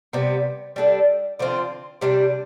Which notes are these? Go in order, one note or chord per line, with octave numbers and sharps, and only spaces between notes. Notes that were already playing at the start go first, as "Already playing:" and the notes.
C3 G3 B3
G3 D4 A4
D3 F3 C4 F4
C3 G3 D4